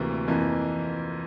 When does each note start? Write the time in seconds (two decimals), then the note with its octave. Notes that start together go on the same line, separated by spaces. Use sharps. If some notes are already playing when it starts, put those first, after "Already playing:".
Already playing: D2 C3 E3 A#3
0.27 F2 E3 A#3